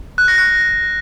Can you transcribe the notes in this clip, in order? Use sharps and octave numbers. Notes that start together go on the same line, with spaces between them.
F#6
A#6
F#6